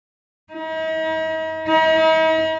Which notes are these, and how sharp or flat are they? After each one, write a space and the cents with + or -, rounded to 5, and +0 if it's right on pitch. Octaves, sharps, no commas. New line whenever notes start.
D#4 +45
D#4 +45